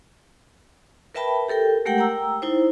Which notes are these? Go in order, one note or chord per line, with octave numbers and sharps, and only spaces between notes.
A#4 B4 E5 G5 A5 B5
G4 A4 A#4 G5
G#3 A3 G4 A#4 F#5 G5
G5 A#5 E6
D#4 E4 C5